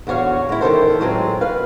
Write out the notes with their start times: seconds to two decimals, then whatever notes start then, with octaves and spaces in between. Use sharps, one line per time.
0.07 E2 D3 F#4 C#5 F5
0.49 G#3 E4
0.61 D#3 E3 A4 C5
1.00 A2 F#3 G#3 B3 C4 F4
1.41 B4 F5